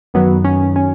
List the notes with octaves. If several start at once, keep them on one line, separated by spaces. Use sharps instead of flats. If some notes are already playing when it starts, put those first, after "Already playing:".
F#2 D#3 F#3 B3
C#4
C#4